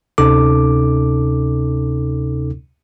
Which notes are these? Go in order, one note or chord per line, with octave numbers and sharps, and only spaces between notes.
D2 C3 C#4 D#4 A4 D6